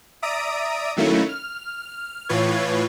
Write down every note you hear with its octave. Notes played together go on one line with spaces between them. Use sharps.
D5 E5 A#5 D#6 D7
D#3 F#3 A3 A#3 C#4 E4
F6
A2 E3 F4 B4 C#5 G#6